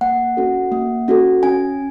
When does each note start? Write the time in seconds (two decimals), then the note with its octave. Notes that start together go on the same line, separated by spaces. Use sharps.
0.01 A#3 F#5
0.37 C#4 F#4 A4
0.72 A#3
1.08 C#4 F#4 A4
1.43 C#4 G#5